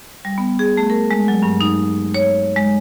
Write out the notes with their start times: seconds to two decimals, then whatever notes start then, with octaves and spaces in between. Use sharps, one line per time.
0.25 G3
0.38 B3
0.59 G#4
0.77 A3
0.90 A#4
1.11 G#3
1.28 F#3
1.43 G2
1.61 D#4
2.15 C#5
2.56 G#3